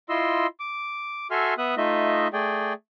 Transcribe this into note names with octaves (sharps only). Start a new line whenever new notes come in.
E4 F4 D#5 C6 E6
D6
F#4 A4 E5 G#5 C6 F6
B3 E5 D#6 F#6
A3 D#4 F4 D#5 E5
A3 G#4 D5 G5